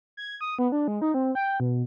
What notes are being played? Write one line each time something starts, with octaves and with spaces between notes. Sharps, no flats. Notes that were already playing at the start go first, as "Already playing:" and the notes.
G#6
D#6
B3
D4
G#3
D#4
C4
G5
B2